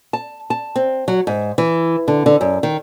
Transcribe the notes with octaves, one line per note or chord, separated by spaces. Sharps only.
A5
A5
C4
F#3
G#2
E3
D3
D3
F#2
D#3